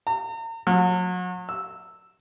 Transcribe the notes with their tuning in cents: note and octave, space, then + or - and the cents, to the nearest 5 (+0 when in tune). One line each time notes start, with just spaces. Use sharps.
A#5 -40
F#3 -35
E6 -5